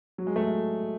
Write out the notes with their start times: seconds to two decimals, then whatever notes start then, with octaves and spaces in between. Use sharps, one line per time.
0.18 F#3
0.27 G#3
0.36 A3